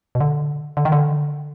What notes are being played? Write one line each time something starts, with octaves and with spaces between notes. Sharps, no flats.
B2
D3
D3
D#3
D3